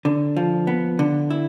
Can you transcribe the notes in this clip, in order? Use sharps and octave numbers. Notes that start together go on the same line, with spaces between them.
D3
F3
B3
D3
E4